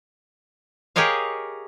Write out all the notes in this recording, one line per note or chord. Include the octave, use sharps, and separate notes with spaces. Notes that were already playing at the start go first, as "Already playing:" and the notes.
G4 G#4 A#4 C#5 D#5 F5